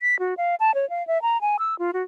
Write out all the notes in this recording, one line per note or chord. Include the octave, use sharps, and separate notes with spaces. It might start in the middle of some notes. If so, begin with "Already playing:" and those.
B6
F#4
F5
A5
C#5
F5
E5
A#5
G#5
E6
F4
F#4